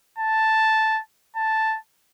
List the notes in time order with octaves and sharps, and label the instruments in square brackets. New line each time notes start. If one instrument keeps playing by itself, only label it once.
[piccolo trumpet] A5
A5